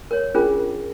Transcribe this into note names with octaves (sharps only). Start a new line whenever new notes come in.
A#4 C#5
C#4 D4 F4 G#4 A#4